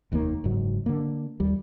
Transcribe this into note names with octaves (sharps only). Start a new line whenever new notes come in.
F1 D#2 D#3 A#3
F#1 G#2 F#3
D3 A#3
D#2 G3